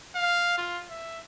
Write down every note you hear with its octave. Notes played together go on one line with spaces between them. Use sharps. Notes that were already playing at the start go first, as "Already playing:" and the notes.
F5
F4
E5